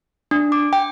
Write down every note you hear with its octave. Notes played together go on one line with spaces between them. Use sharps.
D4
D6
G5